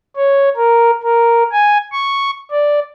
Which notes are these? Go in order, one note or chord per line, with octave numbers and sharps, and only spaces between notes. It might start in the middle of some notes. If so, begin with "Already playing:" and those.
C#5
A#4
A#4
G#5
C#6
D5